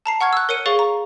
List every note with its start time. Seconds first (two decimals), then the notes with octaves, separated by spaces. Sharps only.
0.06 A5 A#5 C7
0.21 F#5 C#6 F6 G#6
0.33 E6 F#6
0.49 A#4 C#5 C#7 D#7
0.66 G#4 C#5 F5 C#6 A6 G7
0.79 A#5